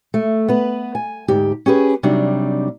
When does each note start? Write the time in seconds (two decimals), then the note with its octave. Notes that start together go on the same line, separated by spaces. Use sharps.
0.14 A3
0.48 B3 B4
0.95 G#5
1.28 D2 G#2 G4
1.66 C#4 G4 G#4 B4
2.03 C3 F#3 G3 D4 D#4